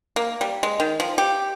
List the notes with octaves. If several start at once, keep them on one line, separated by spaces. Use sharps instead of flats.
A#3
G3
G#3
D#3
F3
G4